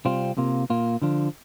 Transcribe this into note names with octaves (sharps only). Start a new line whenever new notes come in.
C3 G3 C4 F4
C3 A#3 F4
A#2 A#3 F4
D3 F3 D4 F4